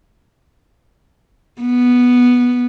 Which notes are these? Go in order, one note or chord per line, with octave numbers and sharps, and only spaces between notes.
B3